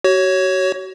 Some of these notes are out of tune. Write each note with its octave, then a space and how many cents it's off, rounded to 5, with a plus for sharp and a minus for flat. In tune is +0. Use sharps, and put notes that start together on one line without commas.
F#4 +35 C#5 +0